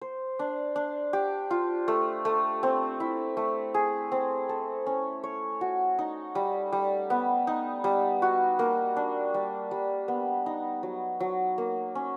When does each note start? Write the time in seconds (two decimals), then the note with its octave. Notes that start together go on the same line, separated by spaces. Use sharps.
0.01 C5
0.39 D4
0.76 D4
1.13 G4
1.51 F4
1.88 A3
2.25 A3
2.63 C4
3.00 E4
3.37 A3
3.74 G#4
4.12 C4
4.49 A4
4.86 C#4
5.24 C#5
5.61 F#4
5.99 D#4
6.35 G3
6.72 G3
7.10 B3
7.47 D#4
7.84 G3
8.22 F#4
8.59 A#3
8.96 D4
9.34 G3
9.71 G3
10.08 B3
10.46 D#4
10.83 F#3
11.20 F#3
11.58 A#3
11.95 C#4